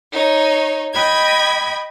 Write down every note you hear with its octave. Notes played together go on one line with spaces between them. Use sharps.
D#4 C#5
D#5 G5 B5 G#6